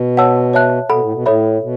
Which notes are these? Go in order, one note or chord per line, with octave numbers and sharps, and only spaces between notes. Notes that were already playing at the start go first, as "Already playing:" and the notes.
Already playing: B2
C#5 F#5 A5 E6
C#5 E5 A5 F#6
B2 A4 F#5 B5
A2
B2
A2 A4 C#5 E5 B5
B2